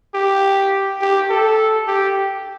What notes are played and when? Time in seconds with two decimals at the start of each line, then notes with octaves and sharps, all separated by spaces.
0.14 G4
1.01 G4
1.30 A4
1.88 G4